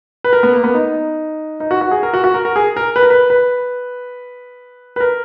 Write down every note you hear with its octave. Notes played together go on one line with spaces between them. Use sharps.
B4
A#4
B3
A#3
B3
D#4
D#4
F#4
F#4
G#4
A#4
F#4
F#4
A#4
A#4
G#4
A#4
B4
A#4
B4
B4
B4
A#4